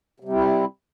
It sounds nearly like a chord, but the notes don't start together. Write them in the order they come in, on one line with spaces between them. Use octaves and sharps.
C3 G3 C4 E4